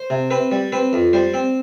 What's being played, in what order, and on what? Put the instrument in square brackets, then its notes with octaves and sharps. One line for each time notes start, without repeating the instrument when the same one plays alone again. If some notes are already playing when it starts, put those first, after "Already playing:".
Already playing: [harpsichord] C5
C3
C4 B4
G3
C4 B4
F2
G3 C5
C4